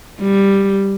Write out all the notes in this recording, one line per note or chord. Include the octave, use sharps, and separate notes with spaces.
G3